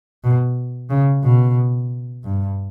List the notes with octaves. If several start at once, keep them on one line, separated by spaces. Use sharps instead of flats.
B2
C#3
B2
G2